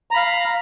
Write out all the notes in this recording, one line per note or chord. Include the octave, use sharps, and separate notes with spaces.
F5 A#5 B5